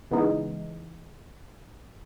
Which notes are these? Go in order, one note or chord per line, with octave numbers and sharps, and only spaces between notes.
C#3 E3 G#3 B3 D#4